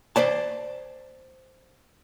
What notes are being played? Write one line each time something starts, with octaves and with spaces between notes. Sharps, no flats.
C5 D5 A5